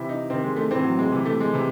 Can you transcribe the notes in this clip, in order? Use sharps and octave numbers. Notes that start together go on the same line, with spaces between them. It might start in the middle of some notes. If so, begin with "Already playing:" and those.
Already playing: C3 E3 E4
D#4
C3 D#3 C4
G#3
A3
A2 E3 C4
F#3
G#3
C3 E3
A3
G#3
C3 E3